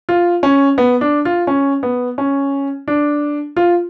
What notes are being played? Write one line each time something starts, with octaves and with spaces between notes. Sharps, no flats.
F4
C#4
B3
D4
F4
C#4
B3
C#4
D4
F4